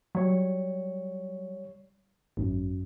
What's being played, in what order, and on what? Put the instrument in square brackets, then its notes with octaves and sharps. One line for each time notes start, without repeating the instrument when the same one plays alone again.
[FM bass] F#3 [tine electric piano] G3 C#5
[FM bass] G#1 [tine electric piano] F#2